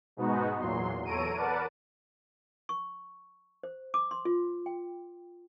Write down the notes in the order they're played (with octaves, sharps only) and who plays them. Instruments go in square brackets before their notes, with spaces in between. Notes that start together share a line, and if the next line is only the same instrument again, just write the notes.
[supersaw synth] G#2 B2 G#3 B3 D#4 F#4
E2 A#2 F#3 C6
E2 A4 C#5 A#5 D7 D#7
A#4 B4 D5 F#5 A5
[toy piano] C#6
C5
D6
C6
F4
G5